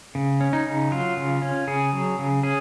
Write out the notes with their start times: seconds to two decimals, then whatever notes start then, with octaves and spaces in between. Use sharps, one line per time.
0.15 C#3
0.41 C#4
0.53 D#4
0.66 C#3
0.91 F#3 F4
1.17 C#3
1.42 C#4
1.67 C#3 G#4
1.93 F#3
2.19 C#3
2.43 C#4 G#4